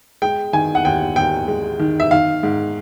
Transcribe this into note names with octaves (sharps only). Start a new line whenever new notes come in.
G#3 G5
D#3 G#5
F#5
D#2 G5
D#2 G5
G#3
D#3
E5
D#3 F5
G#2